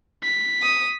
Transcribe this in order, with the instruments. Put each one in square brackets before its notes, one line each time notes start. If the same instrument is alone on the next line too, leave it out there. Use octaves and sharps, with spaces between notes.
[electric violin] B6
[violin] D#6